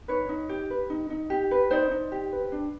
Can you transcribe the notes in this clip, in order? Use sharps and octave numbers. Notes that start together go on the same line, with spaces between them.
D#4 B4 C#5
D#4
G4
B4
D#4
D#4
G4
B4
D#4 C5 D5
D#4
G4
B4
D4